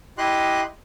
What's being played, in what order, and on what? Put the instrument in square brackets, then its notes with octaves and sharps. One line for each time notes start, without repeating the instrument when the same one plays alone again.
[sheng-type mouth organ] E4 G4 D#5 C6 F#6